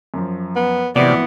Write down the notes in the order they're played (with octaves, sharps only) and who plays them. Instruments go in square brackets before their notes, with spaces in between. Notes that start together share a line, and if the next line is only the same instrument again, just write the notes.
[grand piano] F#2 F3
[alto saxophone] B3
[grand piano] G#1 F3 D7 [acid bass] C3 [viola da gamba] E3 B3 [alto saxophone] D5